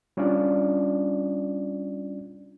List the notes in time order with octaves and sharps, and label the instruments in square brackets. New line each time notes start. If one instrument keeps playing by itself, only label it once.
[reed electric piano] G3 C#4 D4 F4 D5